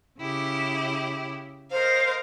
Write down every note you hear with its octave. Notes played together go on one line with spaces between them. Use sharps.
C#3 E4 G4
A#4 C5 D#5 F5